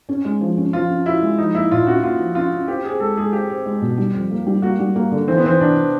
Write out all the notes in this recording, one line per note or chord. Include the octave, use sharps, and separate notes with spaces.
C#4
G#3
F3
C#4
F3 F4
C#4
E4 F#4
G#3
F3 D#4
A#3 E4
A#2 F4
C#4 F#4
A#3 F4
F3
C#4 F4
C#4
C4 G4
C4 G#4
G#3 A4
G#3 G#4
C4 G4
C4
G#3
B2
G3
F2
A#3
G3
A#3 F#4
G3
A#3
D3
E3 C4
B3
E3 C4
C3 D4